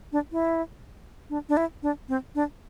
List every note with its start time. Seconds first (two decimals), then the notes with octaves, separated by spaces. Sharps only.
0.12 D4
0.32 E4
1.30 D4
1.49 D4
1.57 E4
1.83 D4
2.09 C4
2.35 D4